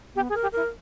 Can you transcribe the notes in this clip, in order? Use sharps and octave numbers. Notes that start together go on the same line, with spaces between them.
B3 G4
G#4
A#4
G4
E4 A#4